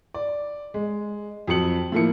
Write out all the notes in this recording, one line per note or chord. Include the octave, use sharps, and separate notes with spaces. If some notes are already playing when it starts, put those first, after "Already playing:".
D5
G#3
F2 F#3 A5 C#7 F#7
A2 F3 A#3 E4 C#7